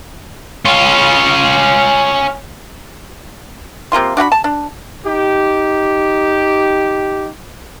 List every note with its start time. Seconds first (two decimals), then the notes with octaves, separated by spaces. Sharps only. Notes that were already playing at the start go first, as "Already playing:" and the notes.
0.65 C#4 F4
3.92 C3 A#3 F4 C6
4.17 D4 F#4 F#5 B5
4.32 A5
4.44 D4
5.06 D#4 G4